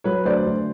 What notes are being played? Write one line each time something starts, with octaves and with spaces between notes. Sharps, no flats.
F#3 B4 C#5
D2 C5 D5
D2